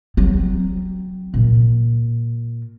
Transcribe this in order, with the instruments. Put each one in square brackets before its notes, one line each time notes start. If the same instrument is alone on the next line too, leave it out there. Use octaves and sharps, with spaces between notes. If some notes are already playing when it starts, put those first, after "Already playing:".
[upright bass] F#3 C4
A#2